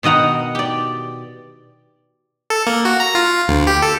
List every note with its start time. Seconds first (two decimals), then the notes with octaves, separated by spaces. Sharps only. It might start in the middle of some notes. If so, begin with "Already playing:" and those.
0.03 B2 D#3 D#5 F#5 A#5
0.55 G4 D5
2.50 A4
2.67 A#3
2.85 F#4
3.00 A#5
3.15 F4
3.48 D2
3.67 G4
3.82 A4